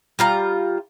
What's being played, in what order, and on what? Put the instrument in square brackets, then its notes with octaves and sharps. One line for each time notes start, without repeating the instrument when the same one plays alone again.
[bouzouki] G3 F4 A#5